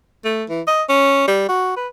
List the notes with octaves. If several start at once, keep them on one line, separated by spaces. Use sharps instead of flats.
A3
E3
D#5
C#4
G3
F#4
B4